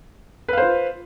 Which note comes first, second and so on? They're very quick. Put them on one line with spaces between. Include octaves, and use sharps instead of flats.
B4 F5 C5 F4